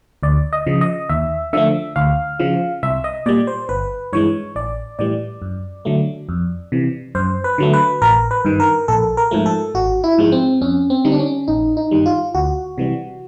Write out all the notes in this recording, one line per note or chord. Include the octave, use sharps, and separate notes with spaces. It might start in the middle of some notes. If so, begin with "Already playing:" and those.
D2 D5
D#5
C#3 F3
D#5
D#2 E5
D3 F3 A3 E5
D2 F5
C#3 F3
C2 E5
D#5
A#2 G3 D5
C5
G1 B4
G2 E3 G#3 C#5
A1 D5
A2 E3 G3 D5
F#2
D3 F#3 A3
F2
C3 E3
F#2 C5
B4
D3 F#3 A3
B4
A1 A#4
B4
G2 D#3
A#4
A#1 A4
A#4
G#2 F3 A3
A4
G#1 F#4
E4
G#2 F3 G#3
C4
F2 C#4
C4
D3 G3 D#4
D4
C#4
A1 D#4
D#4
G2 D#3 G3
F4
D2 F#4
C3 E3 G3